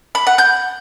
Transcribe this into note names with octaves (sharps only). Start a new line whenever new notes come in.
B5
F#5
G6